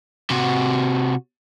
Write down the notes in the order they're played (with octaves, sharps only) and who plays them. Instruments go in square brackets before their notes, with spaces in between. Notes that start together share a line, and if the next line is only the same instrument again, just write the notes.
[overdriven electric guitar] C3 F#4